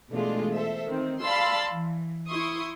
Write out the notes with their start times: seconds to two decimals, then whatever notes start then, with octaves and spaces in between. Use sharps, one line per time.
0.11 B2 E3 G#3 A3 D4 F4
0.53 A4 C5 E5
0.86 D#3 C4
1.22 D5 F5 A5 B5 C6 E6
1.71 E3
2.27 E4 C6 C#6 D#6